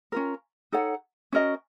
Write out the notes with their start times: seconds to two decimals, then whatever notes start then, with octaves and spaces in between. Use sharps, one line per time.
0.12 C#4 F4 A#4
0.72 D#4 A4 C#5 F#5
1.32 C#4 F#4 A#4 D#5